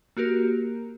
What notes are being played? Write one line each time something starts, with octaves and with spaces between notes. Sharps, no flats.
A#3 F#4 G4 A#4